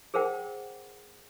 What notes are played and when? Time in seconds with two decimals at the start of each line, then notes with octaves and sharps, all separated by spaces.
0.14 G#4 A#4 C5 F#5 G5